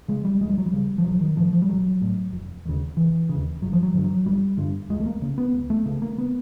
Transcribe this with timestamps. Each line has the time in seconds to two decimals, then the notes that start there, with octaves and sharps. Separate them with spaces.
0.08 C#3 G#3
0.25 G3
0.41 C#2 G#3
0.49 G3
0.58 F#3
0.66 G3
0.73 C#3
0.98 F3
1.04 A#1 F#3
1.21 D#3
1.37 A2 F3
1.53 F3
1.62 G3
1.69 A#1 F#3
2.02 A2
2.33 F1
2.65 D#2 C#3
2.97 F1 E3
3.29 D#2 C#3
3.62 G1 F#3
3.73 F3
3.83 F#3
3.94 G2 D3
4.04 F#3
4.26 G1 G3
4.57 G2 D3
4.90 C#2 G#3
5.00 A3
5.06 A#3
5.22 C#3
5.38 B3
5.54 C#2
5.70 A3
5.86 C#3 A3
6.02 A#3
6.18 B3